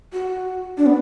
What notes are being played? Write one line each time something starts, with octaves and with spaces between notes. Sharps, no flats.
F#4
D4
B3